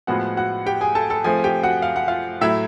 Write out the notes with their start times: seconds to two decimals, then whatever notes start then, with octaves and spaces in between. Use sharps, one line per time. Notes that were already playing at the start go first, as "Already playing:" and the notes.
0.07 A2 F3 G#3 B3 F#4 F#5
0.37 F#4 F#5
0.66 G4 G5
0.81 G#4 G#5
0.95 A4 A5
1.10 A4 A5
1.24 F3 A3 C4 G#4 G#5
1.44 G4 G5
1.63 F#4 F#5
1.82 F5
1.96 F#5
2.08 F4 F5
2.41 A2 F#3 A3 E4 E5